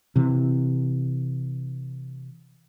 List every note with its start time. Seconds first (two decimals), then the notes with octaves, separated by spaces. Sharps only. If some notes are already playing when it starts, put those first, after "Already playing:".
0.16 C3 E3